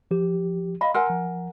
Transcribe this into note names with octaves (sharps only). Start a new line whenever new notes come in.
F3 G4
D#5 F5 B5
A#4 F#5 G#5 C6 E6
F3